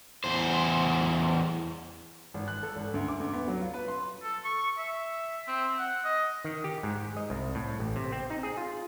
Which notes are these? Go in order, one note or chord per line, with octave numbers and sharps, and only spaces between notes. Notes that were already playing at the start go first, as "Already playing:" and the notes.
E2 C5
G#1
F#6
A4
G#1
D2
D6
D2
B3
F#3
F4
B4
C6
A4
C#6
E5
C4
F#5
D#5
D#3
G4
G#2
D#5
C2
A2
A1
C3
C4
D#4
G#4
F4